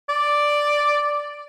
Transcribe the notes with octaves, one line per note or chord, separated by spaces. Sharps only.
D5